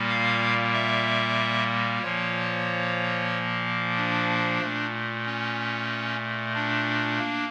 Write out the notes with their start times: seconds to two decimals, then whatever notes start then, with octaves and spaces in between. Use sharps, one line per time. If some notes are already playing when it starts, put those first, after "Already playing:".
Already playing: A#2 G3 A#3
0.09 F5
0.73 E5
2.02 A#2 F3 A#3 C#5
3.96 D4
4.61 A#2 A3
5.26 C#4
6.55 D4
7.19 A#3